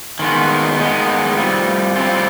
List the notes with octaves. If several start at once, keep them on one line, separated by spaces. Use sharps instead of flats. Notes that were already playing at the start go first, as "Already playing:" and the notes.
D#3 G#3 B3
D#3 G#3 B3
G3 C4 F4
G3 C4 F4